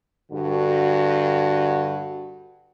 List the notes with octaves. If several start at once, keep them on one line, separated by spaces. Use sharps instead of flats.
G2 D3 F#4